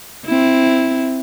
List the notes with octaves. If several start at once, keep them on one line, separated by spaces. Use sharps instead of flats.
C4 E4